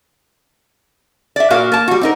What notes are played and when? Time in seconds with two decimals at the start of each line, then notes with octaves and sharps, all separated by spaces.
1.36 D5 E5
1.50 A#2 F#4 A#4 F5
1.72 A#3 A5
1.88 G3 F#4
2.01 C4 D#4 A#4